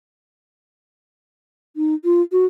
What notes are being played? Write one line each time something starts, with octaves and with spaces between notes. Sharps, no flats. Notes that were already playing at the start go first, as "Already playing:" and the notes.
D#4
F4
F#4